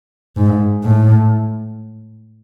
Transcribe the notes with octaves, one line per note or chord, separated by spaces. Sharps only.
G#2
A2